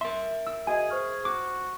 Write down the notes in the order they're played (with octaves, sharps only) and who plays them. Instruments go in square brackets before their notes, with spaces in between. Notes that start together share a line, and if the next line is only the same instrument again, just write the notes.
[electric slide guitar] A#4 E5 [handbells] C6
[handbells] E6
[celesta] F#4 D#5 D#7 [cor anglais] G#4 [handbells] G#5
[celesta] C5 C#6 F6
[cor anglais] F#4 [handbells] D6